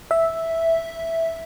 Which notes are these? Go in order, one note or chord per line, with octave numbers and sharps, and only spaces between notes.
E5